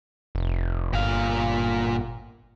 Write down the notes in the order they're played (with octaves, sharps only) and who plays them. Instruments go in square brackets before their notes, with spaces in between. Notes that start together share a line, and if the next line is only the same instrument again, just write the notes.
[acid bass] F1
[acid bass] G1 [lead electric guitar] A#2 F5